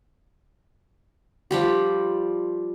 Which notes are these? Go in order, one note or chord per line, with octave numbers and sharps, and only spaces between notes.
F3 G3 G4